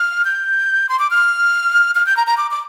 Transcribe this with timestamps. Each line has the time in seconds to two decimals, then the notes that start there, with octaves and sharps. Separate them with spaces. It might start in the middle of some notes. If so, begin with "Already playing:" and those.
Already playing: F6
0.25 G6
0.89 C6
0.99 D6
1.11 F6
1.95 F6
2.06 G6
2.17 A#5
2.27 A#5
2.37 D6
2.51 D6